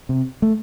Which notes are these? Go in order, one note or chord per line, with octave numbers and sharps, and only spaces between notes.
C3
A3